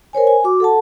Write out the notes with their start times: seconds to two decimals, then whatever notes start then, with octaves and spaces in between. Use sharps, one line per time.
0.13 A#4 C5 C#5 G#5
0.27 G#5
0.44 F#4 D6
0.60 A4 F#5 A5